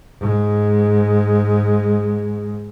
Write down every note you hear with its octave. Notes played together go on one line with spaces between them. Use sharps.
G#2 G#3